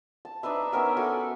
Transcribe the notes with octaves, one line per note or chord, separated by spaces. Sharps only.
A5
D4 D#4 B4 E5
B3 C#4 A#4 E5
F#4 A4 G#5 D6